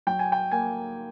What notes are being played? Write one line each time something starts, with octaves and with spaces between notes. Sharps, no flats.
F#3 G5
G#5
G5
A#3 G#5